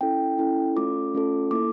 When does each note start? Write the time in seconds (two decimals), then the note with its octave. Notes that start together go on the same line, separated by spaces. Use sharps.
0.01 C#4 E4 A4 G5
0.38 C#4 E4 A4
0.76 A3 C#4 F4 A4 D6
1.14 A3 C#4 F4 A4
1.51 A#3 E4 A4 D6